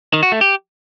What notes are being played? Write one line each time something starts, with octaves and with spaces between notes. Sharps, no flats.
D#3
F#4
A3
G4